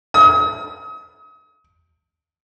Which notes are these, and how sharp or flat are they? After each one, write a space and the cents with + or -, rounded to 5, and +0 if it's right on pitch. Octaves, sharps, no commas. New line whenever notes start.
D#6 +35